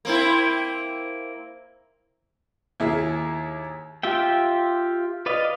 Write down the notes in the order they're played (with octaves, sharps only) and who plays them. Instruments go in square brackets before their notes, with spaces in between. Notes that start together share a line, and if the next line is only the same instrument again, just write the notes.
[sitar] A#3 C4 E4
[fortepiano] D#2 E4 G#4
[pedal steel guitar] F4 G4 E5 G5
B4 D5 D#5 F5